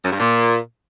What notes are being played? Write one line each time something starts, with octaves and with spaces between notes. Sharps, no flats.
F#2
G2
A#2